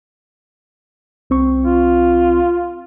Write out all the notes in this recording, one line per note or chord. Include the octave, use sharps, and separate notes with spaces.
C2 C4 C#6
F4